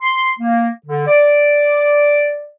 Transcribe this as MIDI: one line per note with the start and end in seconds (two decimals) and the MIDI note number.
0.02 0.32 84
0.39 0.69 58
0.87 1.03 50
1.07 2.49 74